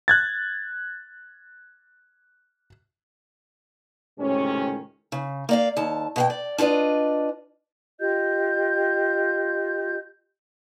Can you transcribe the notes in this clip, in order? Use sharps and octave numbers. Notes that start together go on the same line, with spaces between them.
F#6 G#6 A6
C#2 A2 C3 D#3 C#4
C#3
A#3 D5 F5
D#2 A5
B2 F5 G5
D5
D4 F4 B4 D5 D#5
F4 G4 D#5 G6